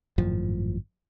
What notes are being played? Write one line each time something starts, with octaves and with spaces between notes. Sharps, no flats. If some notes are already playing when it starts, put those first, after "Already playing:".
G#1 F#2 A2 F3